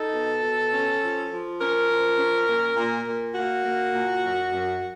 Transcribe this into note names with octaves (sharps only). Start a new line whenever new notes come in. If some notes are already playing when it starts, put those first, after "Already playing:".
Already playing: D#4 A4
B2
B2
C#4
F3
F3
C#4 A#4
F3
C#4
A#2
A#2
A#2
A#3 F#4
A#3
A#2
F#2
F#2